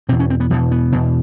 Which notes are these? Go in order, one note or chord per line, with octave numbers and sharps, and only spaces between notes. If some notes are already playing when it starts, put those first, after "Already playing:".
E2 B2 C4
C#4
C4
B3
E2 B2 F3
B3
E2 B2